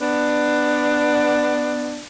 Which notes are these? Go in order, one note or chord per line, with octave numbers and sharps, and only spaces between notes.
B3 D4